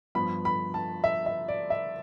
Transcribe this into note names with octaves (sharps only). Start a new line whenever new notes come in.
G2 F3 B3 B5
B5
A5
E5
E5
D5
E5